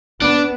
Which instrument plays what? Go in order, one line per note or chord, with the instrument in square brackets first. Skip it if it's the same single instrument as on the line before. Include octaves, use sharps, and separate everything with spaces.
[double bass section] B3 [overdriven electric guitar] D4